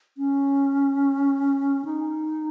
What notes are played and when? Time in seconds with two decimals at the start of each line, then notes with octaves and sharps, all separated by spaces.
0.18 C#4
1.85 D#4